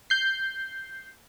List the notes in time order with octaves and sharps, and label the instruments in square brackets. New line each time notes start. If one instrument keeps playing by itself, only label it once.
[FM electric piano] G6 C7